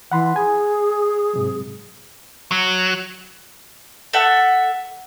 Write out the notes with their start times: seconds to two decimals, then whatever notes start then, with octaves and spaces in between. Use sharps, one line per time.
0.12 E3 F#5 B5 C6
0.36 G#4 G#5
1.33 G#2 C3 F#3
2.51 F#3
4.13 A4 E5 F#5